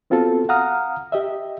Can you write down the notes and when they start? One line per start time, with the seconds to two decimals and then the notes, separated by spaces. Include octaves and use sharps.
0.10 B3 C4 F4 F#4 A4
0.49 F5 F#5 A#5 D#6 F6
1.12 G4 D#5 E5